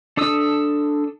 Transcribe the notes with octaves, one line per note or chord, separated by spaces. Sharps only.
D4 A4 D#6 E6